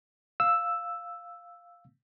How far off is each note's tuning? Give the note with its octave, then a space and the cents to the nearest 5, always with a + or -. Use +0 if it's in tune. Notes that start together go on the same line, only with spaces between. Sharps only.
F5 +0 E6 +0